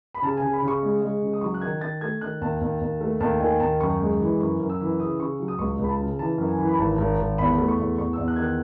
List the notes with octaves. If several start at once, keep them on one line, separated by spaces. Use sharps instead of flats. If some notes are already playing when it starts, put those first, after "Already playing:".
B5
C#3 A5
C#3 G#5
B5
C#3
C#6
G#3
G#3
C#3
D#6
F#3 C#6
F#6
D#3 G#6
D#3 A6
A3 G#6
D#3 F#6
D#2 A5
D#2
D#2
A3
D#2 A5
D#3 G#5
D#2 A5
F#2 C#6
G#3
E3
F#2 C#6
F#2
E6
E3
C#3 D#6
C#3 C#6
F#3
D#6
C#2 C#6
C#2
B5
A5
C#3
E3 A5
F#2
G#5
E3
B5
G#1 A5
G#1
G#1
E2 B5
A3
C#6
E2
E2 C#6
E2 E6
F#6
D#3 G#6
F#6